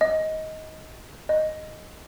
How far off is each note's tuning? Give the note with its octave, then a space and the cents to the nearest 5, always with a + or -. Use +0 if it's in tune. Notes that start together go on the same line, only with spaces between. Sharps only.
D#5 +15
D#5 -5